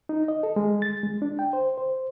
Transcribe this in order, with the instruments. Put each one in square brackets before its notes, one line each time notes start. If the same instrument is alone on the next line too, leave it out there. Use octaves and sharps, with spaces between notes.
[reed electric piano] D#4
D#5
A4
G#3
A6
G#3
D4
G5
C5
C5